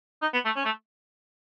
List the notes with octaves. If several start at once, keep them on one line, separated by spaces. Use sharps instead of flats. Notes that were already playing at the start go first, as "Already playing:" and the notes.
D#4
B3
A3
C#4
A3